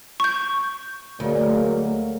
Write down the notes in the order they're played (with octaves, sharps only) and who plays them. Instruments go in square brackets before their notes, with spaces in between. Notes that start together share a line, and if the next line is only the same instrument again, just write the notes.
[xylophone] C#6 G6
[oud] D2 [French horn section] F#3 G#3 A#3